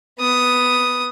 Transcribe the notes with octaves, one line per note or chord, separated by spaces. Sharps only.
B3 D#6